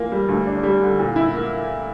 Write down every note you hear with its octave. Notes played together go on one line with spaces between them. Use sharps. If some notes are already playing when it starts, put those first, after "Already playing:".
Already playing: E3 A#3 F4
G3
D2
D4
G3
D3
A#2
E4
A#3